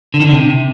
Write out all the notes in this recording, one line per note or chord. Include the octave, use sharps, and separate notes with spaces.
D3
D#3
D3
C3